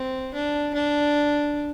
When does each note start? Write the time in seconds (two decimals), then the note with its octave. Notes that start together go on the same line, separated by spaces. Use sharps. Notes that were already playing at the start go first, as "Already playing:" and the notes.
Already playing: C4
0.34 D4
0.74 D4